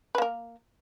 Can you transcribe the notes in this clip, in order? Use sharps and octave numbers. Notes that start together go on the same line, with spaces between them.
A#3 A#4 B4